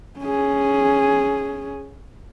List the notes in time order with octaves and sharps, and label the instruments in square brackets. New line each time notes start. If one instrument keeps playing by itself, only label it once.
[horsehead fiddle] C#4 G#4